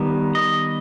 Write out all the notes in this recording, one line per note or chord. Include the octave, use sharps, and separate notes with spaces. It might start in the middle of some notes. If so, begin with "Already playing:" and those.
Already playing: D#3 G3 B3
D#5